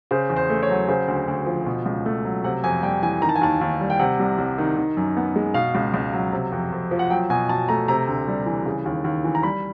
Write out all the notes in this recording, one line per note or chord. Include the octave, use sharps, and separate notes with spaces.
C#3 C5
E2
C5
A3
C#5
F#3
C#3 C5
D2
D2
F3
B2
C#2
A3
F#3
C3 F#5
F2 G#5
G3 G5
E3 G#5
D#3 A#5
A5
G#5
D#2 A5
D#2
G3
G5
C3 F#5
C2
C2
D#3
D#3
F#2
B3
G#3
B2 F5
C#2
C#2
F#3
C3
F2
F2
F3
F#5
F#3 G5
B2 G#5
B2 A5
A3 A#5
C3 A#5
D2
G3
E3
C#3
D#2
D#2
E3
A#5
G3 B5